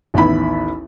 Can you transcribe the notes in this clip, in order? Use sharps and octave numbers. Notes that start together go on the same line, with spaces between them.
A1 D#2 B3 E4 B5